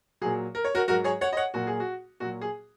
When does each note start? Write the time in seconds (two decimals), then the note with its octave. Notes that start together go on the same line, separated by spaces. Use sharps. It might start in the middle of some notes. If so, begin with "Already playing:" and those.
0.21 A#2 F#3 G#4
0.55 A#4
0.65 C#5
0.75 F#4 A#4
0.88 G#2 F#3 F#4 A#4
1.04 G#4 C#5
1.21 C#5 F#5
1.33 D#5
1.37 C#5 F#5
1.54 A#2 F#3 F#4
1.67 G#4
1.80 F#4
2.20 A#2 F#3 F#4
2.41 G#4